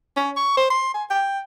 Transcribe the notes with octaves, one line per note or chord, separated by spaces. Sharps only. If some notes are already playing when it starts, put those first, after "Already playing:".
C#4
C#6
C5
C6
G#5
G5